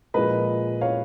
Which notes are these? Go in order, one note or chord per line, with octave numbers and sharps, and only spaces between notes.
A#2 F3 G#3 B4 D#5
C#5 F5